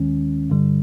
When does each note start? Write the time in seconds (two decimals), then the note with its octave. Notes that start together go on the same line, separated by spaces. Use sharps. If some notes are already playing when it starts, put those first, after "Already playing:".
Already playing: D#2 D#3 G#3 C#4
0.50 G2 D3 G3